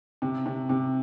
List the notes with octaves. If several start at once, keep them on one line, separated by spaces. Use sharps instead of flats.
C3
C3
C3